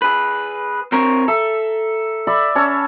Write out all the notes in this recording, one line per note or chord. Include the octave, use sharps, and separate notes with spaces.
G#4 B4
C4 A#4 C#5 A#5
A4 E5
D5 E5 B5
C#4 A4 C#5